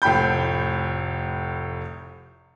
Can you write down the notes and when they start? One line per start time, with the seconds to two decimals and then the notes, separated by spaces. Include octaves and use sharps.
0.02 F1 A2 G5 B5 G6